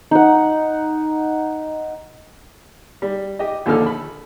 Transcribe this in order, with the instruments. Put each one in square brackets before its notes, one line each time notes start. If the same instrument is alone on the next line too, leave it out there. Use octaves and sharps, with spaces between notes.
[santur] D#4 F#5
[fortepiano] G3
G4 D#5
A#1 D#2 D3 A4 F6
B5